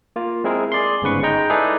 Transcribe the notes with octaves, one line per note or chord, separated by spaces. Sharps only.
A#3 F4
G#3 C4 E4 G#4 A#4
G#4 D5 C6
G1 G#2 C#3 B4 C#6
G#3 D#4 D#5 G5 A#5
D#4 E4 G#4 A4 B4 D5